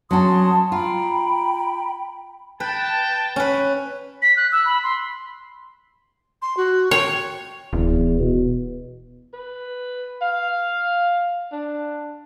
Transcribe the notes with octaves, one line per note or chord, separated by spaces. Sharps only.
F#3 C#4 F#4 A5 C6 D#6
F4 G5 A#5 B5
B4 G5 A5
C#4 B4
B6
F#6
E6
B5
C6
C6
F#4
C#5 G5
D1 E2
B2
B4
F5
D4